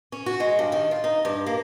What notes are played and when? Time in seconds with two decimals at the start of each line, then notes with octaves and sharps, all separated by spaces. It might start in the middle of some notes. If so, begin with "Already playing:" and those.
0.12 C#4
0.26 F#4
0.40 G#3
0.59 G2
0.72 D#3
0.91 F4
1.04 D#4
1.25 G2
1.47 A#3